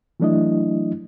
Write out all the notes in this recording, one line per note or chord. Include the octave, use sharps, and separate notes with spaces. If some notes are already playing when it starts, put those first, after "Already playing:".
E3 F#3 A3 D4 E4 D#5